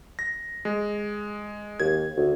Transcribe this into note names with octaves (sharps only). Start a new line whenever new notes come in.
A#6
G#3
D#2 G#6
D2